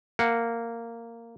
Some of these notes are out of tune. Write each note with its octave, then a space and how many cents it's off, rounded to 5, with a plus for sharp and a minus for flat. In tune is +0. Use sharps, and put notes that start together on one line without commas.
A#3 -10 F#5 +0